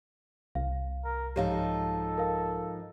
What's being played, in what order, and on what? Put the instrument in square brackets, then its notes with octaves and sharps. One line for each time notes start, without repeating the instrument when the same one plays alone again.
[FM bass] C2 [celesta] F5
[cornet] A#4
[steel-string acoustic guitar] G#2 F3 D#4 [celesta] G4 C#5 F5 [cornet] A4
[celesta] A#4 F5